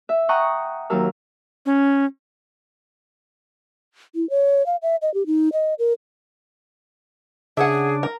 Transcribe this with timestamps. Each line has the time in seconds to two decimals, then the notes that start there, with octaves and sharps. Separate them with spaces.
0.09 E5
0.29 F#5 G5 A#5 C#6 D#6
0.90 D#2 F#3 A#4 F5 E6
1.66 C#4
4.15 E4
4.30 C#5
4.66 F5
4.82 E5
5.02 D#5
5.14 G4
5.26 D#4
5.53 D#5
5.79 A#4
7.57 C#3 D4 G#4 E5 F#5
8.03 A#4